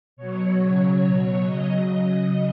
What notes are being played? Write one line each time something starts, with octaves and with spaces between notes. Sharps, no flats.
B2 F#3 C#5
C#3 F#3 C#5
B2 F#3 C#5
C#3 F#3 D#5
C#3 F#3